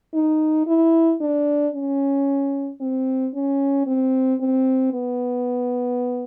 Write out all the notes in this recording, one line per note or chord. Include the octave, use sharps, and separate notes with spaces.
D#4
E4
D4
C#4
C4
C#4
C4
C4
B3